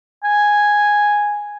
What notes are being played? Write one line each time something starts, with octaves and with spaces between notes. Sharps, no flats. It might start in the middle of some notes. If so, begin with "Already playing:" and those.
G#5